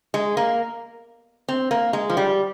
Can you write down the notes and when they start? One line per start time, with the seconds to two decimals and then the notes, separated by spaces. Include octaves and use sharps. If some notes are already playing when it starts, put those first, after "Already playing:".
0.14 G#3
0.37 A#3
1.49 C4
1.71 A#3
1.93 G#3
2.10 F3
2.17 G3